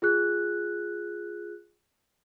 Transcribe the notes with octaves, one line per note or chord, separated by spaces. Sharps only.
F4 G#4 F#6